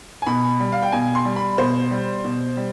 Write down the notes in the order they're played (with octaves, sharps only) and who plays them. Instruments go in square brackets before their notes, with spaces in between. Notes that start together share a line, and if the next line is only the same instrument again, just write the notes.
[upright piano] G#5
B2 B5
G3
F5
G5
B2 G#5
C6
G3
B5
B2 C5
G3
B2
G3